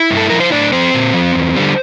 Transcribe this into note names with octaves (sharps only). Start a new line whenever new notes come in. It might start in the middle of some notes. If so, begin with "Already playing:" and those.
Already playing: E4 E5
G2
A4
F3 A#4
C5
A2 D4 D5
F3 C4 C5
A#2
F3
E2
D3 G3